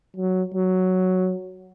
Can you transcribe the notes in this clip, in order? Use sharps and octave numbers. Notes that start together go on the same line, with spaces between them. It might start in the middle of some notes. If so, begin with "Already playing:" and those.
F#3
F#3